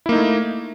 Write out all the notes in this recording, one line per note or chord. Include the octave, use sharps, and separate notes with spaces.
A3 A#3 D#4 E4